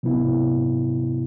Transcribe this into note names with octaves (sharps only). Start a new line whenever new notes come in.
C3 F#3 B3 E4